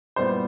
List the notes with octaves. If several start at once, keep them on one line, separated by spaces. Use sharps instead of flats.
A#2 G3 B3 E4 C5